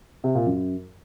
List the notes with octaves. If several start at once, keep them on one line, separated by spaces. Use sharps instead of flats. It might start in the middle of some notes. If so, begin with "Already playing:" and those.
C3
A#2
F#2